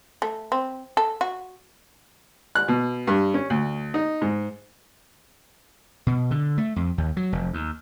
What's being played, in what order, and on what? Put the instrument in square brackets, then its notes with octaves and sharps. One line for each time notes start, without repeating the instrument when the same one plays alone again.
[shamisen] A3
C4
A4
F#4
[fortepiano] F#6
B2
G2
C#4
D2
D#4
G#2
[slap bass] B2
D3
A3
F2
D#2
F#3
F1
D#2